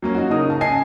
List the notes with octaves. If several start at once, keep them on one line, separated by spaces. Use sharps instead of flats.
F#3 A#3 C#4
D#4 F#4
C#3 D#4 A#4 D#6
C#3 A5
D#5 G#5 A5 C7